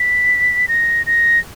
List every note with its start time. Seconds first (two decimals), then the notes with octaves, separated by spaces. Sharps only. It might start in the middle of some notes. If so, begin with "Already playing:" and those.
Already playing: B6
0.68 A#6
1.06 A#6